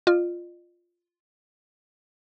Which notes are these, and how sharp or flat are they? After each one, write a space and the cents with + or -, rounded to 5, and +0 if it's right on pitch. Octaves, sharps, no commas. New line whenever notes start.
F4 +0 D#5 -45